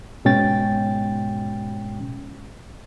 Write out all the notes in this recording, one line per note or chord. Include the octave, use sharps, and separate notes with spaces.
G#2 B2 G#3 C#4 G5 A6